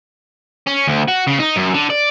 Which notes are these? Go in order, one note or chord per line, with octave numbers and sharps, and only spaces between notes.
C#4
D2
F#4
C#3
D#4
F#2
D3
D5